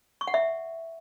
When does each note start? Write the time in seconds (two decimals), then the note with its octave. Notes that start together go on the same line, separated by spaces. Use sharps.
0.21 C#6
0.27 F#5
0.34 E5